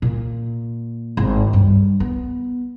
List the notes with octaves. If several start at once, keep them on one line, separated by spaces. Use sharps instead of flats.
A#2
G#1
G2
B3